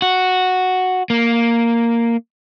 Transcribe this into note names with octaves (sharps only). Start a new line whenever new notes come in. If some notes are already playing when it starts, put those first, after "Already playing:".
F#4
A#3